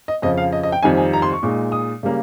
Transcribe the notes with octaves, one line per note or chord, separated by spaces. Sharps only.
D#5
F2 C#3 F3 D#5
F5
D#5
D#5
G5
F2 D#3 G3 C4 D#4 G#5
G#5
A#5
C6
C#6
A#2 G#3 D#4
D#6
C#3 G3 A#3 C#4